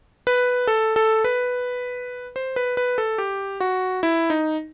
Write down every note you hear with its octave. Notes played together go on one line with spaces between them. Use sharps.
B4
A4
A4
B4
C5
B4
B4
A4
G4
F#4
E4
D#4